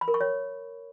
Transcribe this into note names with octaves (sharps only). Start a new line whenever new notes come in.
B5
A#4
C#6
C#5